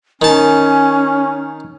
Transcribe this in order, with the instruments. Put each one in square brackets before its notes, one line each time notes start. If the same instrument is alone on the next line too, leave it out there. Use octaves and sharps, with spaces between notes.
[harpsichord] D#3 A5 [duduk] C#4 [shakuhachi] G#5